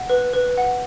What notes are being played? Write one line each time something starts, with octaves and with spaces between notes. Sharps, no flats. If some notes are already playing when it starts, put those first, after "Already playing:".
Already playing: F#5
B4
B4
F#5